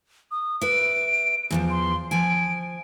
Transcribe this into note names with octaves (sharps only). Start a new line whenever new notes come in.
D#6
B4 E5 D7
E2 A2 F3
C6
F3 G#5 D7